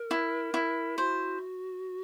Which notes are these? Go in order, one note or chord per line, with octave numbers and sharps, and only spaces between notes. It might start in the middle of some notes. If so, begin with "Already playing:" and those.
Already playing: A#4
E4
E4
F#4 C5